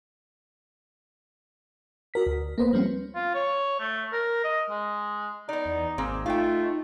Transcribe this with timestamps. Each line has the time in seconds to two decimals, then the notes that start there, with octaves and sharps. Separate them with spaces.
2.14 F#4 A#4 B6
2.27 D2
2.58 A#3 B3 B4 C5
2.73 F3 G3 C4 C#4
3.15 F4
3.35 C#5
3.80 A3
4.13 A#4
4.44 D#5
4.70 G#3
5.49 B3 D#4 D5
5.65 E2
5.98 G#1 A#3 C4 G#4
6.26 A3 D#4 F4 F5 G5